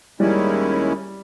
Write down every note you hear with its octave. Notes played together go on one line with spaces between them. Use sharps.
D#2 D#3 G3 G#3 C#4 E4